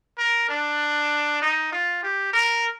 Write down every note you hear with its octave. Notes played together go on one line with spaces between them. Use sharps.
A#4
D4
D#4
F4
G4
A#4